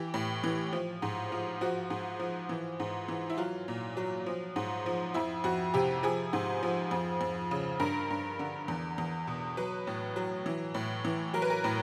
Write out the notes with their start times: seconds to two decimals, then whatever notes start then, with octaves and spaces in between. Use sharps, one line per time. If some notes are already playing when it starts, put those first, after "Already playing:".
Already playing: E3 G4
0.14 A2
0.44 E3
0.73 F3
1.02 G#2
1.32 F3
1.61 F3 F#4
1.90 G#2
2.20 F3
2.49 E3
2.80 G#2
3.08 E3
3.30 E4
3.37 F#3 F4
3.68 A#2
3.97 F#3
4.26 F3
4.56 G#2
4.86 F3
5.14 F2 E4
5.44 F2 F#4
5.74 C3 G4
6.03 F3 G#4
6.33 G#2
6.63 F3
6.91 F2
7.21 F2
7.51 C#3
7.80 G2 A#4
8.10 G2
8.39 D3
8.68 E2
8.98 E2
9.27 B2
9.57 F#3 B4
9.87 A2
10.16 F#3
10.46 E3
10.74 A2
11.05 E3
11.34 F#3 A#4
11.42 B4
11.50 A#4
11.64 A2